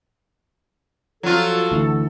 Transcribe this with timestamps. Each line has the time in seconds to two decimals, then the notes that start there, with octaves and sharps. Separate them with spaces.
1.23 F3 F#3 F4 F#4 A4
1.71 D2 E3